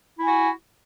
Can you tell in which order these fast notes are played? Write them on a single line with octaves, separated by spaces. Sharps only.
E4 G#5 F#4